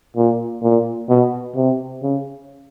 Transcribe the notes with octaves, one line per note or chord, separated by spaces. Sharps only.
A#2
A#2
B2
C3
C#3